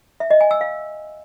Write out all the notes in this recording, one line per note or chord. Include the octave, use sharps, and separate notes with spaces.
E5
D#5
G#5
E6
F5